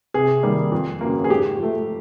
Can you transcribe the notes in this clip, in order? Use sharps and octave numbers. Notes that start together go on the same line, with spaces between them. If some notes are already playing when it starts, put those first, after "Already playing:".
C3 G#4
D#3 G3 A#3
F2
C#3 F#3 A#3
G#4
G#2 G4
F3 A3